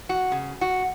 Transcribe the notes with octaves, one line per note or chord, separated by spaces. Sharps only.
F#4
C#3
F#4